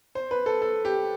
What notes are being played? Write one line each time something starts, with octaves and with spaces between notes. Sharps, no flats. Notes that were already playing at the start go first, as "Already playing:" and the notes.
C5
B4
A4
A4
G4